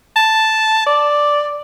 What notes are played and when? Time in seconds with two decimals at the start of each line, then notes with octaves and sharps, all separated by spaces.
0.16 A5
0.87 D5